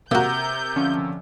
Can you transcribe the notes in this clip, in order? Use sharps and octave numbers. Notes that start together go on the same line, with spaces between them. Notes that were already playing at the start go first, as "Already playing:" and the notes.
C3 A#3 F#4 A#4 G6
D3 F3 C#4